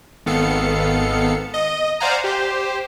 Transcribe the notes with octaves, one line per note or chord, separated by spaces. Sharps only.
G#1 D#3 B3 A4 F5 C#7
D#5
C5 D5 F5 F#5 G#5 A#5
G4 C5